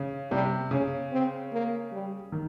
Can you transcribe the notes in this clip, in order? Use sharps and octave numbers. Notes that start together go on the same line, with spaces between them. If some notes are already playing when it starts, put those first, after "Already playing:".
Already playing: C#3
C3 G3
C#3 C#4
C4
A#3
G3
D#3